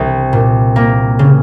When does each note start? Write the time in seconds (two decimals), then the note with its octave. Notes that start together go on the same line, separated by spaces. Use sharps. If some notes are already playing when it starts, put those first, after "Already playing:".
Already playing: C2
0.33 A#2
0.76 A#3
1.19 C#3